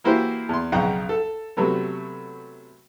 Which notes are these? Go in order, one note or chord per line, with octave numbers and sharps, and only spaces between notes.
E3 A#3 E4 F#4 G4 C5
E2 C6
B1 F2 C#3 F#5 G5 A#5
A4
C3 F#3 A3 B3